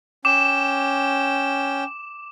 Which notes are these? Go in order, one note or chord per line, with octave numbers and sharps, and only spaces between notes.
C#4 G5 D6 E7